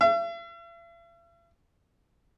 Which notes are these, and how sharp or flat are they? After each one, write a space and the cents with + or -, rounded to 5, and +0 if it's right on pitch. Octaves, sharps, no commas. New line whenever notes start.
E5 +45